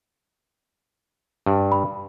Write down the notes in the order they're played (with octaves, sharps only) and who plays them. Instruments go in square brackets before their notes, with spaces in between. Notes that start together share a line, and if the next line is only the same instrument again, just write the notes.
[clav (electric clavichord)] G2
[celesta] B5